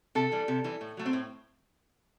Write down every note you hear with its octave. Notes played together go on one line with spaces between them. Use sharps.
C3 A4
E3 G3
C3
E3 G3
A2
F#3 A3
C4
A2